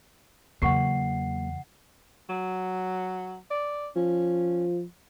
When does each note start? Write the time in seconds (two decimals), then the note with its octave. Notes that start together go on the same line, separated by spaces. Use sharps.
0.62 E2 C#3 F#3 A#3 F#5 C#6 C7
2.29 F#3
3.51 D5
3.96 F3 C#4